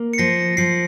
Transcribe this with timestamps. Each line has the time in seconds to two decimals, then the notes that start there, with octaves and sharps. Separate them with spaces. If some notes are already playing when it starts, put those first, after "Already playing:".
Already playing: A#3
0.13 C#7
0.18 F3 A#6 C7
0.57 F3 C7 D7